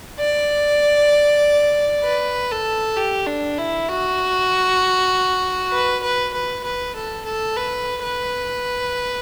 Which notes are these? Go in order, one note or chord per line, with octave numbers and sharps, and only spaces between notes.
D5
B4
A4
G4
D4
E4
F#4
B4
B4
B4
B4
A4
A4
B4
B4